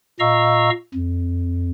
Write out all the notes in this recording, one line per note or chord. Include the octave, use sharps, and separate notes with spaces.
A#2 D#5 F5 A#5 C#6 E6
F2